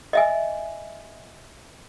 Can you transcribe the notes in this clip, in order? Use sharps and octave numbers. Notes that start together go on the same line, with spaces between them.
D#5 E5 G#5